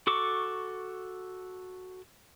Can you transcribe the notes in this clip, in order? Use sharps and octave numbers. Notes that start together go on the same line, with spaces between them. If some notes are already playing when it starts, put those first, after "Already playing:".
F#4 A4 C#6 D6